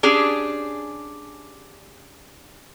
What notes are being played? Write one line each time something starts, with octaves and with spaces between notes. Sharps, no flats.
C#4 D4 G4 G#4